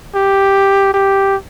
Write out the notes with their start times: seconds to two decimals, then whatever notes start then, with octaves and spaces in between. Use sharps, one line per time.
0.15 G4
0.94 G4